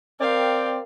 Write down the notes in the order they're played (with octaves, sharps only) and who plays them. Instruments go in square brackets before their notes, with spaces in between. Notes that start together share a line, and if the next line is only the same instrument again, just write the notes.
[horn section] C4 D5 G5 [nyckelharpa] A#4 F5